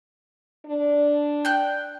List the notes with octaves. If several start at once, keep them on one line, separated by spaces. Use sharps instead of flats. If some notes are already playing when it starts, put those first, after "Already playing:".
D4
G5 F#6